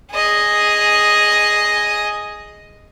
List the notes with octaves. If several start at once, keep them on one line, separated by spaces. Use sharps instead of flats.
G#4 D#5